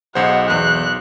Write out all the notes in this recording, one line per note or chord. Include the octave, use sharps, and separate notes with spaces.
B1 D#4 G#4 C5 F#5
E2 F#6